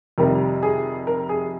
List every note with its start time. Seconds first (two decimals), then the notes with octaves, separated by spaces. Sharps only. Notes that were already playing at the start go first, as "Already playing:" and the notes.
0.18 F2 C3 D#3 G3 A#4
0.63 G#4
1.07 A#4
1.29 G#4